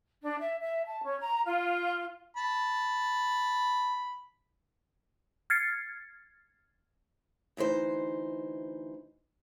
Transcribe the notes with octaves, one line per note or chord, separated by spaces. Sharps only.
D4
E5
E5
A5
C#4
A#5
F4
A5 B5
F6 G#6 A6 C7 C#7
D2 E3 D#4 C5